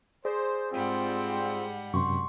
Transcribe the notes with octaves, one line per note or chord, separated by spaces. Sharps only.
G#4 C5 D5
G#2 G3 C4 F4 F#5
F#2 C3 C6 C#6